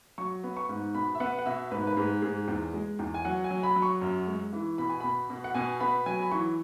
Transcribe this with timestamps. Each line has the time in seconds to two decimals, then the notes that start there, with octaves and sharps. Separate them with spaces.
0.18 F#3 C#6
0.44 B3
0.57 C#6
0.69 G#2
0.95 B2 B5
1.15 E5
1.20 B3 F#5
1.39 F#5
1.46 B2 E5
1.71 G#2 B4
1.87 B4
1.97 G#2 G#4
2.22 G#2 G#4
2.48 E2
2.73 G#3
2.99 E2
3.14 G#5
3.25 F#3 F#5
3.44 G#5
3.51 F#3
3.63 B5
3.76 F#3
3.82 C#6
4.02 F#2
4.27 G#3
4.53 E3
4.78 B2 B5
4.89 G#5
5.00 B2 B5
5.30 B2
5.44 F#5
5.55 B2 G#5
5.80 B3 B5
6.06 F#3 G#5
6.22 B5
6.32 E3 C#6